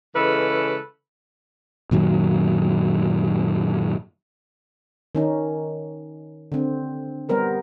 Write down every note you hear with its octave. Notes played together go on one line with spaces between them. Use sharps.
C#3 E3 G#3 A4 B4
F#2 A#2 D#3 F#3
D#3 C#4 D#4
D3 C4
G3 B3 A#4 C5